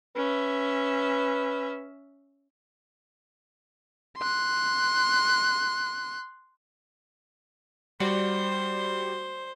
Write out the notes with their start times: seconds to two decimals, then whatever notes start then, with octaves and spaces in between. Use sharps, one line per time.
0.17 C#4 B4 E5
4.18 C6 F#6
8.00 G3 F#4 C5 D5